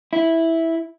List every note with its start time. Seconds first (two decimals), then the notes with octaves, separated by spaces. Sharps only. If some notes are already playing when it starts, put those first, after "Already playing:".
0.13 E4